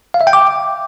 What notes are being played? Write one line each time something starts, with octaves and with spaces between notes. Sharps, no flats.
F5
E5
G5
D6